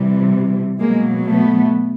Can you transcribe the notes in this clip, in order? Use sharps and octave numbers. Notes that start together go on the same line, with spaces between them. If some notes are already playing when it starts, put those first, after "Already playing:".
Already playing: C3 E3 G3
B2 F#3 G#3 A#3
A3 B3